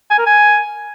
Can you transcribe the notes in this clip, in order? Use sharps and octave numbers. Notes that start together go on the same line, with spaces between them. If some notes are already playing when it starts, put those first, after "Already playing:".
G#5
A#4
G#5